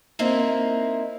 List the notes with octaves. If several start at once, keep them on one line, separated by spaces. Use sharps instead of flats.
A#3 C4 D#4 E4